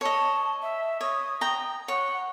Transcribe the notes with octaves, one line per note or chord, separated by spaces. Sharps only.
C#5 D#5 A5
E5
C#5 D#6
G5 A#5
C#5 F#5